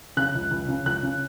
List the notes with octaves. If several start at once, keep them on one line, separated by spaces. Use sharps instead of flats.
C#3 F#6
C#2
C#2
C#3
C#2 F#6
C#3